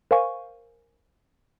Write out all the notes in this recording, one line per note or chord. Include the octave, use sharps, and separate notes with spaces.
A#4 C5 F5 G#5 C#6